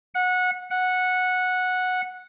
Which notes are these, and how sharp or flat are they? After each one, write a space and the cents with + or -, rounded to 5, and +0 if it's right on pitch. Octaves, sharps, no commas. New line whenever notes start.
F#5 -20
F#5 -10